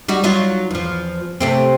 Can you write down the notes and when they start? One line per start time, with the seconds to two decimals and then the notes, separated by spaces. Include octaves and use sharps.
0.08 G3 D#4 F#4
0.24 F#3 D#4 F4
0.71 E2 F3
1.41 C3 A3 C4